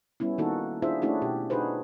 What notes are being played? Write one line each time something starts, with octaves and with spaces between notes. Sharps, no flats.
G3 B3 C#4 E4
D#3 A#3 B3 D#4 F#4 A4
D4 E4 F4 G#4 C5 E5
A3 C#4 D4 E4 F#4 G#4
B2 G4
D4 D#4 F#4 G#4 B4 C5